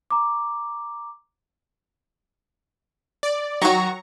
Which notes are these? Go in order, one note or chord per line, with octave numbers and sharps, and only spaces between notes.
A#5 D6
D5
D#3 F#3 F#4 A#5 C#6